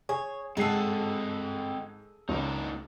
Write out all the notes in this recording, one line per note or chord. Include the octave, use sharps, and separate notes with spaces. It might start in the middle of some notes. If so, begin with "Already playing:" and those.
G#4 C#5
G#2 G#3 C4 G#4 A4 D#5 F#5 C7
C#2 A#3 D4 D#4